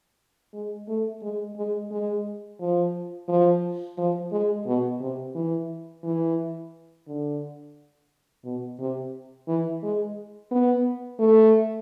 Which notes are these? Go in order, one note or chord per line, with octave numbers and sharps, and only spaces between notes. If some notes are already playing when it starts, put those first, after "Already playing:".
G#3
A3
G#3
G#3
G#3
F3
F3
F3
G#3
B2
C3
E3
E3
D3
B2
C3
E3
G#3
B3
A3